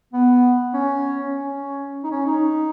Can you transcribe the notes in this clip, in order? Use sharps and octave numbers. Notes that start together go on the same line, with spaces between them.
B3
C#4
C#4
D#4
C#4
D#4